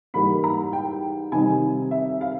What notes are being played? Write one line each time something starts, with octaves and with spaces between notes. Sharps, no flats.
G#2 E3 G3 A#3 D#4 B5
A#5
G5
C3 D#3 G3 C4 D#4 G#5
E5
F5